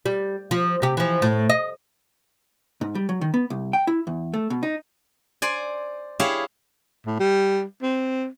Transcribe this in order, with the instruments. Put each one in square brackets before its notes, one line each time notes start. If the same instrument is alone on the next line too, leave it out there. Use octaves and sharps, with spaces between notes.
[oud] G3
F3
C3 G4
E3 F3
A2
D#5
[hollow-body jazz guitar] G#2
G3
F#3
D#3
B3
C2
G5
E4
E2
A3
B2
D#4
[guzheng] C5 D5 G#5
E4 G4 G#4 C#5 E5 F5
[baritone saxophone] A2
G3
C4